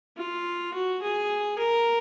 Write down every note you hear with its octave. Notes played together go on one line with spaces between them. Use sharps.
F4
F#4
G#4
A#4